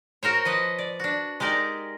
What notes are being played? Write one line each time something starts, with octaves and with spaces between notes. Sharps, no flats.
F#4 A#4 C5 C#5
F3 B4 D#5 F#5
D5
D4 F#4
G#3 D#4 G4 A#4 D5